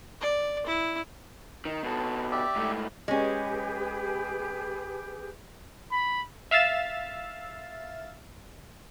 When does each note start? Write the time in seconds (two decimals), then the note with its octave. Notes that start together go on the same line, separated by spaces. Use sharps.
0.21 D5
0.66 E4
1.65 D#3
1.83 B2 A4
2.32 G4 D5 E5
2.56 G#2 A3
3.08 G#3 C#4 G4 G#4 B4
5.92 B5
6.51 E5 F5 E6 A6 E7